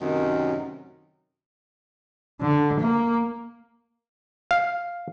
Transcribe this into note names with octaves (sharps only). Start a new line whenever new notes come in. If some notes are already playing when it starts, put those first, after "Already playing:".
F#2 A2 C3 D#3
D3
A#3
F5